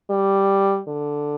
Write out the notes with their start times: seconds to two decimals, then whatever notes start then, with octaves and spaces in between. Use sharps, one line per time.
0.10 G3
0.88 D3